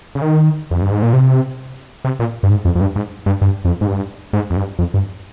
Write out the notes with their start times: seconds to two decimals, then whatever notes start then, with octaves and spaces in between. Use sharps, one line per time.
0.15 C#3
0.22 D#3
0.71 F2
0.82 G2
0.91 G#2
1.02 A#2
1.13 C3
2.05 C3
2.20 A#2
2.43 G2
2.50 G#2
2.65 F2
2.75 F2
2.81 G2
2.96 G#2
3.26 G2
3.41 G2
3.65 F2
3.81 G#2
3.87 G2
4.33 G#2
4.50 F2
4.56 G2
4.79 F2
4.94 G2